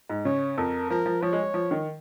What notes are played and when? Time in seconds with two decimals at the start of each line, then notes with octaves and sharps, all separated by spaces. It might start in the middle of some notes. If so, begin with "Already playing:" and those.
0.10 G#2
0.25 C#3 C#5
0.58 F2 A#4
0.90 F3 A#4
1.06 F3
1.22 F3 C#5
1.33 G#3
1.43 G#3
1.54 F3
1.71 D#3